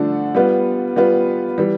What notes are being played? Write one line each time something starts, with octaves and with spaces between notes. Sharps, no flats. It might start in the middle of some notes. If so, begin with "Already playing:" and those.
Already playing: D3 F3 A3 D4
G3 B3 F4 B4
G3 B3 F4 B4
E3 G3